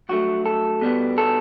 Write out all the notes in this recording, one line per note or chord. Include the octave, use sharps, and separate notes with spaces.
G2 F#3 A3 F#4
A4
B2 G3 B3
A4